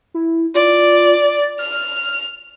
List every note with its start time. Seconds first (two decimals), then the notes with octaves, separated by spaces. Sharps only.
0.14 E4
0.55 F4 D5
1.25 A6
1.59 F6 F7